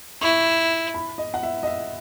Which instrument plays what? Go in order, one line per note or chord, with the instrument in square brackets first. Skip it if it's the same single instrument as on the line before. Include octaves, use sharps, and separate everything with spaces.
[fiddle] E4 [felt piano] C#6
[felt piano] B5
D#5
F#5
E5
D#5
E5